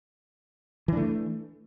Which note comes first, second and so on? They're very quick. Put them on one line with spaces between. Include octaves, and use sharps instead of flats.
E3 D4 A3